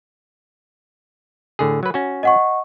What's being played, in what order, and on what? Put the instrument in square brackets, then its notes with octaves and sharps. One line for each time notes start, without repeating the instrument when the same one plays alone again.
[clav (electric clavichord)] A2 D3 G#4
F#3 B4
C#4 F#4
[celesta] D#5 F#5 C#6